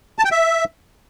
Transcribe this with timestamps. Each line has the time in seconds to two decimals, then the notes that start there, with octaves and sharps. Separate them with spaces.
0.19 A5
0.25 G5
0.31 E5